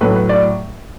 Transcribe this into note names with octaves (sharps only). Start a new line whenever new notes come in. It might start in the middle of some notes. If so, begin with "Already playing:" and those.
A2 F#3 A3 B4
B4
D5